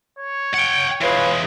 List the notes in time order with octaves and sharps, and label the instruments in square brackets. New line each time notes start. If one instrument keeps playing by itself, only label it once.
[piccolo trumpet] C#5
[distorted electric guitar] F#5 G5
[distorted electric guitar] E3 G#3 [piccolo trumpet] F4 [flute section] B4 C#5 F5